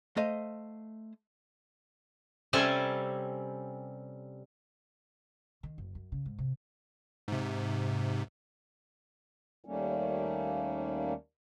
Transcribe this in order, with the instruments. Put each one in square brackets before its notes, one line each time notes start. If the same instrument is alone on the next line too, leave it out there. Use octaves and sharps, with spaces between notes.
[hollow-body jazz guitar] A3 C5 D#5 F5
[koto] C3 G3 C4 C#4 A4 G#5
[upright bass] D#3
F#1
F#2
C#3
G#2
C3
[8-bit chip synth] G#2 C3
[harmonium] D#2 D#3 G3 A3 A#3 C#4